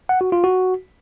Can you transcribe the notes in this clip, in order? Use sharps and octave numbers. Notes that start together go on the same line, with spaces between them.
F#5
F#4
F4
F#4